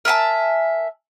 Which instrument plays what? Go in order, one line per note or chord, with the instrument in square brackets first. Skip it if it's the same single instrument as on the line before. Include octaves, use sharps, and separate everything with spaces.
[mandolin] A#4 E5 G#5 A5